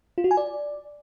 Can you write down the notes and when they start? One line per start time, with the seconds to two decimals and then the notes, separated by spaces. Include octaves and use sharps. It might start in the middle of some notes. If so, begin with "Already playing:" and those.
0.18 F4
0.24 F#4
0.31 G#5
0.37 D5